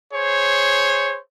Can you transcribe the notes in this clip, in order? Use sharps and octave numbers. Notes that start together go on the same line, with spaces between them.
G#4 C5 C#5